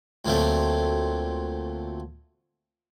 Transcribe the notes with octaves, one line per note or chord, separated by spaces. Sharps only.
D2 A#2 F#3 A3 C4